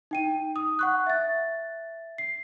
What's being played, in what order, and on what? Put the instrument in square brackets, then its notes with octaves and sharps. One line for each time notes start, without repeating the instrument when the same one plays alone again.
[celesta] D#4 G5 D#7
D#6
F#5 C#6 F#6
E5 A6
C7